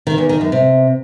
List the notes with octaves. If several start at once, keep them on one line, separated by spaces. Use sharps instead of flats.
D#3
E2
D#3
F#2
C3